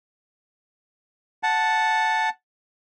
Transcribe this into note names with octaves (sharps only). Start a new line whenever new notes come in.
F#5 A5